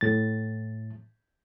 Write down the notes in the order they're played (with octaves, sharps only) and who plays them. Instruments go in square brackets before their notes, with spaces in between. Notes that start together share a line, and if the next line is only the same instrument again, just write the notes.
[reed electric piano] A2 A6